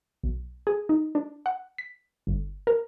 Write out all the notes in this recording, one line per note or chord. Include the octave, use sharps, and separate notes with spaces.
B1
G#4
D#4
D4
F#5
B6
G1
A#4